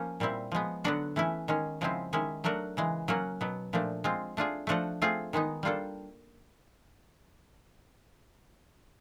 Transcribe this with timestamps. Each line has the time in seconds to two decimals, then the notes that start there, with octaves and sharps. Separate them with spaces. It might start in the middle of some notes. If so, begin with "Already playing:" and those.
Already playing: F3 A#3 C#4
0.20 A#2 G3 C4 E4
0.52 F3 G#3 B3
0.84 D3 F#3 B3 D4 F#4
1.16 E3 A3 C#4 E4
1.48 D#3 G#3 C#4
1.81 C#3 F3 G#3 C4 E4
2.13 D#3 G#3 C#4 E4
2.44 F#3 A3 D4 F#4 A#4
2.77 C#3 E3 G#3
3.08 F#3 A#3 C#4 F#4
3.41 B2 F#3 B3
3.73 A#2 F3 A3 D4
4.04 G#3 C4 F4
4.37 A3 D4 F4 G#4
4.67 F3 A3 D4 F#4 A4
5.02 A3 C4 F4 G#4
5.33 D#3 G#3 B3 D#4
5.63 G3 A#3 D4 F4 A4